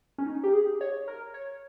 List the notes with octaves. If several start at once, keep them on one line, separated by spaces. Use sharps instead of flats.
C#4
D#4
G4
G#4
C#5
A#4
C#5